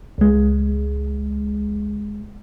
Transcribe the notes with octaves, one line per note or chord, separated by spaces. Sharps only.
C#2 G#3